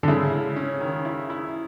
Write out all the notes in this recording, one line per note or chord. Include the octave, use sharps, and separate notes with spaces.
D3
C#3 E4
G#3
C#4
D#3
E4
E4